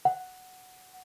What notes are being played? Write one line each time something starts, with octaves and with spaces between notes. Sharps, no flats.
F#5